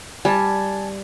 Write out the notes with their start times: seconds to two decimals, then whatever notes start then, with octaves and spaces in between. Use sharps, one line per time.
0.25 G3 G#5 A5